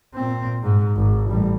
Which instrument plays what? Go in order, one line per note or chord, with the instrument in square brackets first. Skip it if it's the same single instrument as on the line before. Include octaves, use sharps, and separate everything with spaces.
[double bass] A#2 C4
G#2
G#1
A1 G3